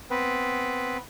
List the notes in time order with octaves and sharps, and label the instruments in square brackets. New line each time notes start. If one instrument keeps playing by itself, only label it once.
[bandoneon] B3 C4 B4